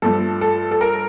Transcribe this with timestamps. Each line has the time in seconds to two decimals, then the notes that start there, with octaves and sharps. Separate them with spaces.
0.02 G2 F3 A3 A4
0.41 A4
0.71 A4
0.81 A#4